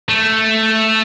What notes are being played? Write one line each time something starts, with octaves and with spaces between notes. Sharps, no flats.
A3